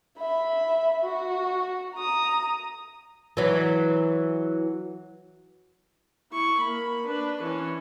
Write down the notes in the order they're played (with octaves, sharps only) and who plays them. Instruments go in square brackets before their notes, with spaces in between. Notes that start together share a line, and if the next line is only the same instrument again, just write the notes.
[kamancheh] E5 B5
F#4
A#5 D#6
[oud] E3 F#3
[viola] E4 C#6
A#3 B5
D4 B4
E3 C#4